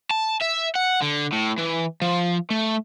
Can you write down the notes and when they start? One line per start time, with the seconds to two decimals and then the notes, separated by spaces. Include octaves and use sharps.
0.11 A5
0.41 E5
0.75 F#5
1.02 D3
1.33 A2
1.58 E3
2.02 F3
2.50 A3